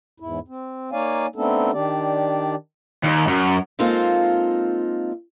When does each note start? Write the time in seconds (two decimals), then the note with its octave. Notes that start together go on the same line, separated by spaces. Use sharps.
0.20 E2 G#2 E4
0.48 C4
0.92 A#3 D#4 C#5 D5 F5 G#5
1.36 A3 B3 C4 D4 D#4 A4
1.72 D#3 D4 G4 D5
3.04 D#2
3.29 F#2
3.79 G#3 A#3 C4 D#4 F4 A4